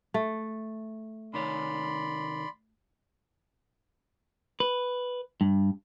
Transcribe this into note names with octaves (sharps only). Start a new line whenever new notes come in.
A3
C3 D#3 C#5 D5 B5 C6
B4
G2